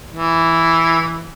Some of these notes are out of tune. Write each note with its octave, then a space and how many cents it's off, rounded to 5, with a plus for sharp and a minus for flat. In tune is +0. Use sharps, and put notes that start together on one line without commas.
E3 +0